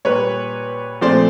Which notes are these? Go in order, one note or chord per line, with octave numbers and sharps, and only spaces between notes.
A#2 G3 A#3 B4 C#5
A#2 F3 A3 C4 C5 D5